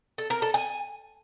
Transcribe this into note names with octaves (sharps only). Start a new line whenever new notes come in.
A4
A#4
A4
G#5